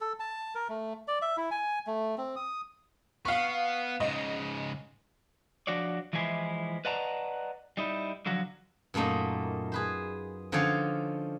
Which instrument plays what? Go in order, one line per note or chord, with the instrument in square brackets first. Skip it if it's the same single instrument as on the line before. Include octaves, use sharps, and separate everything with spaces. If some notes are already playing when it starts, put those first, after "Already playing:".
[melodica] A4
A5
A#4
A3
D5
E5
E4
G#5
A3
C4
D#6
[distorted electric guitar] B3 [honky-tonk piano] F5 C#6
[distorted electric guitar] G#2 C#3 [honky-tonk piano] D#5
[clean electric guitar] F3 D4 F#4 C#5 D5
E3 F3 G#3 E4 G#5
B4 D5 D#5 F#5 A5 A#5
G3 D#4 E4
D3 F3 F#3 F#4
[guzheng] F#2 A#2 A3 A#3 D#4
G#4 B4 C5
D3 F3 C#4 D#4 C#5 F5